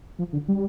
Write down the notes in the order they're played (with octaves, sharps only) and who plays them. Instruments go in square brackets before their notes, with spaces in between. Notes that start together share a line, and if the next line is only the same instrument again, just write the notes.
[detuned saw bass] F3
D3
G3